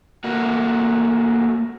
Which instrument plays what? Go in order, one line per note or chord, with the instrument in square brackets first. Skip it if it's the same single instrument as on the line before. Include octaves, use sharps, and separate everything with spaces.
[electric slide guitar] A3 A#3 F#4